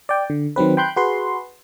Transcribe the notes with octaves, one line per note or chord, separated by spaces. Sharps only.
D5 G5
D3
D#3 F#3 C4 B4
G5 B5 C6 F#6 G6
F#4 G#4 B4 C6